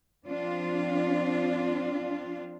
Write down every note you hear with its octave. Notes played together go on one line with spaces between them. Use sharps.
F3 C4 D4 F4